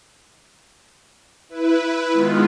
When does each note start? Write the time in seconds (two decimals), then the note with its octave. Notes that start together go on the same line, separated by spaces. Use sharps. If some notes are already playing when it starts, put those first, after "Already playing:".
1.49 E4 B4
2.13 D#3 G#3 B3 F4